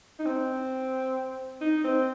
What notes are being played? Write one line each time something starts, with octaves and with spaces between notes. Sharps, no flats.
D#4
C4
D#4
C4